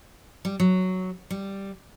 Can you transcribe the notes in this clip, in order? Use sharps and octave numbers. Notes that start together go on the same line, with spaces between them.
G3
F#3
G3